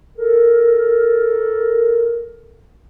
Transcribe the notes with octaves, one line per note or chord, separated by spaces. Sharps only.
A4 A#4